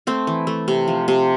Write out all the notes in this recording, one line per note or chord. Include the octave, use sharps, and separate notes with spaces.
A3 C4
E3
A3
C3
F3
C3